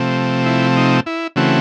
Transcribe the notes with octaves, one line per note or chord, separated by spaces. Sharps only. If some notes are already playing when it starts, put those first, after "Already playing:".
Already playing: C3 F3 A3 C4
E4
D#4
E4
C#3 E3 A3 C4 F#4